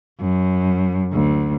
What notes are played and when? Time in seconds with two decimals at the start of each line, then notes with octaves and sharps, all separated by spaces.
0.19 F#2
1.11 D2